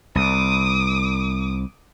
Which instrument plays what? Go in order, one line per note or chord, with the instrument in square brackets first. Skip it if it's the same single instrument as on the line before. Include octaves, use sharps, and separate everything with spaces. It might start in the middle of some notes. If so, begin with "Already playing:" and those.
[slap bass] C2 [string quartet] D6 D#6